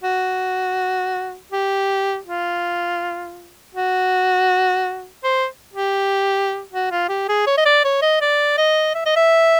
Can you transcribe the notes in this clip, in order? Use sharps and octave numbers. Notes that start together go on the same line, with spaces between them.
F#4
G4
F4
F#4
C5
G4
F#4
F4
G4
G#4
C#5
D#5
D5
C#5
D#5
D5
D#5
E5
D#5
E5